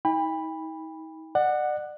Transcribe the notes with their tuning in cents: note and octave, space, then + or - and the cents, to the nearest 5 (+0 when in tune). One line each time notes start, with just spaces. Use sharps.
D#4 +40 G5 +40 B5 +0
D5 +35 F#5 +0